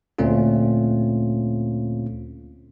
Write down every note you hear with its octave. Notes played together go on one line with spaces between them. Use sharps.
D2 A#2 A3 C4 C#4 F4